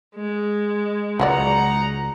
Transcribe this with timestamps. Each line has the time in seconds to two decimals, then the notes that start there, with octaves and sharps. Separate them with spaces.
0.16 G#3
1.20 C#2 F#3 D#4 F#4 D5 F#5 A#5